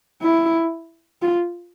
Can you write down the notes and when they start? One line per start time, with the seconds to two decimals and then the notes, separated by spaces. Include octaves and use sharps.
0.22 E4
1.22 F4